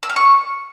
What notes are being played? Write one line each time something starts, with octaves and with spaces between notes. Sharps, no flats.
E6
F6
C#6